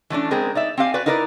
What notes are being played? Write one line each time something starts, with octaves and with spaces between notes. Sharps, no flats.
E3 A3 C#4 D4
G#3 B3 C4 G#4 A#4
D#4 D5 E5
C4 G4 F5 G#5
F#4 B4 D5
D#4 E4 A#4 B4 D5